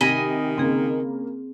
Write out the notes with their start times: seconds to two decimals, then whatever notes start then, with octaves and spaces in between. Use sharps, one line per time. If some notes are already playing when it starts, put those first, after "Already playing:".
0.01 C3 D#3 D#5 G#5 B5
0.58 C#3 A#3 C4 G#4